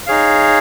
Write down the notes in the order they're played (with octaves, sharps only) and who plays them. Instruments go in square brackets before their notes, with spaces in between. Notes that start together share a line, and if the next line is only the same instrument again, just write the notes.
[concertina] D#4 G#4 C#5 F5